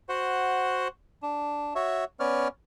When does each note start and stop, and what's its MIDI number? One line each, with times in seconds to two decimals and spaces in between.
0.09 0.88 66
0.09 0.88 72
0.09 0.88 78
1.23 1.74 62
1.75 2.04 66
1.75 2.04 73
1.75 2.04 76
2.20 2.48 59
2.20 2.48 61
2.20 2.48 73
2.20 2.48 74
2.20 2.48 89